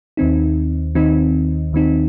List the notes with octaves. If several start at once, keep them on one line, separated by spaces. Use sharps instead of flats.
D#2 D#3 C4 D#4
D#2 D#3 C4 D#4
D#2 D#3 C4 D#4